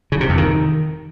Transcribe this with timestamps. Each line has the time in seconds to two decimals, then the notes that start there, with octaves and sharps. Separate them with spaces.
0.12 C#3
0.21 C3
0.29 F2
0.38 D#3